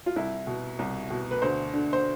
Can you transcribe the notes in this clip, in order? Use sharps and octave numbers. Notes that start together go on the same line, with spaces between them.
F4
C2 E4
B2
C2
B2
B4
D2 C5
D3
C5